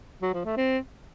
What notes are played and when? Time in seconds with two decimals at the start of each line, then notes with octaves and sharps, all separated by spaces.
0.22 F#3
0.34 F3
0.45 A3
0.57 C4